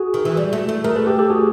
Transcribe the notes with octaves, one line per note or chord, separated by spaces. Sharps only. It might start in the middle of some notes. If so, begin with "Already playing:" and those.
Already playing: F#4 G#4
D#3
E3
G3
A3
A3
A3 G#4 A#4
A4 B4
G4 A4
G4 A4
F#4 G#4